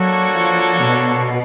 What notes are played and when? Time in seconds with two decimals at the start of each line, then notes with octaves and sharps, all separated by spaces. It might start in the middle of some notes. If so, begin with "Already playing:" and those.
Already playing: F#3 A#3 D4 F#4 A4 C#5
0.32 F3
0.82 B2